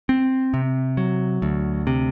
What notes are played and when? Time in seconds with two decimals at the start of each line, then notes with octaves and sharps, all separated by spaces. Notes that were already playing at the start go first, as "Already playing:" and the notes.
0.09 C4
0.54 C3
0.97 F#3
1.42 D2
1.87 C3